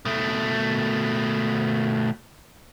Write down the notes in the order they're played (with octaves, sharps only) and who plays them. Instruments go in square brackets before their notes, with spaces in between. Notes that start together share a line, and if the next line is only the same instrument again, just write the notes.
[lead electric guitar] B2 A3